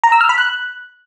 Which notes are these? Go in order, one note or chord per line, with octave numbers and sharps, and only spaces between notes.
A#5
E6
F6
B5
F#6